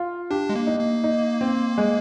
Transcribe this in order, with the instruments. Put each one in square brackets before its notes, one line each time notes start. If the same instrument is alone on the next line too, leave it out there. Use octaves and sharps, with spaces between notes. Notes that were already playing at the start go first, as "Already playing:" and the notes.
Already playing: [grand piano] F4
[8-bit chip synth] D4 [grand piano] G4
[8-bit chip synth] G#3
A#3
[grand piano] D#4
[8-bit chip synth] A#3
[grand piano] D#4
C4
G#3